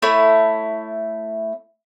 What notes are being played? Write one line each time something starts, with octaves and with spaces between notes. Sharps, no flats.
A3 E4 C#5